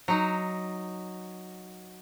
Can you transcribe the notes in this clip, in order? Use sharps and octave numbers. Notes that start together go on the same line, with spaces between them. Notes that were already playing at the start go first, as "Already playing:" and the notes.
F#3 D#4